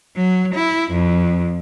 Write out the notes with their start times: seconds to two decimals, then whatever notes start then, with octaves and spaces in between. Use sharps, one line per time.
0.16 F#3
0.54 E4
0.91 F2